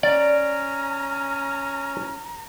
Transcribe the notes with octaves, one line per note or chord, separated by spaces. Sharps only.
C#4 D5 A#5